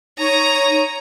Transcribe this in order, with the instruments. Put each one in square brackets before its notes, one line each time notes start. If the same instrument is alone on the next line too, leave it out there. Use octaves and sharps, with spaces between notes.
[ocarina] D#4 [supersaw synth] C#5 [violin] A#5 D#6